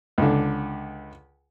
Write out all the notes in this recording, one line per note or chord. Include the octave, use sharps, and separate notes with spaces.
C#2 D3